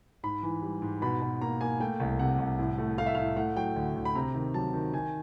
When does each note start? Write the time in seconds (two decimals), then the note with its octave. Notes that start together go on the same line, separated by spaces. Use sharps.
0.23 G#2 B5
0.43 E3
0.62 G3
0.82 G#2
1.02 B2 B5
1.22 B2
1.41 A#3 A#5
1.61 A#3 G#5
1.80 A3 G5
2.00 C2
2.19 C3 F#5
2.38 C2
2.59 A2
2.78 A3
2.98 A3 F5
3.06 E5
3.15 A2 F5
3.36 A3 F#5
3.56 F#3 G5
3.76 D2
3.96 D2
4.05 B5
4.15 C3 A#5
4.35 D#3
4.54 F#3 A5
4.74 D#3
4.93 D#3 G#5